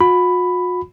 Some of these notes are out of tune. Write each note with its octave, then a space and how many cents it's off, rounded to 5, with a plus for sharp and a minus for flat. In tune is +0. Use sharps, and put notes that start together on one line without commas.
F#4 -45 B5 +10